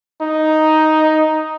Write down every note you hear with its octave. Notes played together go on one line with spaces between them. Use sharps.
D#4